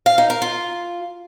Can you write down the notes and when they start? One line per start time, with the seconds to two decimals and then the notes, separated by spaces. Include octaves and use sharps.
0.06 F5
0.18 D#4
0.30 A#4
0.42 F4